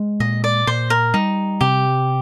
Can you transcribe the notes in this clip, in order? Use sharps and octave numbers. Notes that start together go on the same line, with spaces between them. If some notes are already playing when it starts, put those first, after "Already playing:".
Already playing: G#3
A#2 D#5
D5
A#2 C5
A#4
G3 D#4
C3 G4